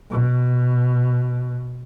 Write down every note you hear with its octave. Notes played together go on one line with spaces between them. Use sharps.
B2